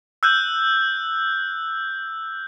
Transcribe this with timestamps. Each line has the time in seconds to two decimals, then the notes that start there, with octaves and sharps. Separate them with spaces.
0.23 E6 F#6 G6